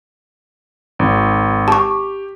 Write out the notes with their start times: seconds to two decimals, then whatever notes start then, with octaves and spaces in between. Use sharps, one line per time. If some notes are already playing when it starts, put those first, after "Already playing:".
0.99 G#1
1.68 G4 A5 C#6